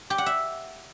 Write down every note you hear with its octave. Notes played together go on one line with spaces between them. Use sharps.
G4
F#5
E5